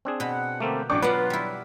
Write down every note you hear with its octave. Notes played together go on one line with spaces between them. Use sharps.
C4 D4 G#4
B2 F#5 B5
D3 G3 A3 A#3 C4
A1 F#3 D4 C#5 D5 G5 C#6 D6
F#3 B3 F4 B4 D5 F#5
G3 E4